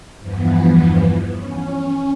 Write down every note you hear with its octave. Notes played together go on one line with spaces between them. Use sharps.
E2 G2 E3 F3 B3
C#4